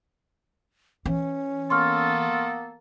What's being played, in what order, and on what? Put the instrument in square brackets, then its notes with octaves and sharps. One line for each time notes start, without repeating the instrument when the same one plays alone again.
[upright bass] E3 [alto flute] C#4
[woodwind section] A#3 B3 A4 [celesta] C6 C#6 F6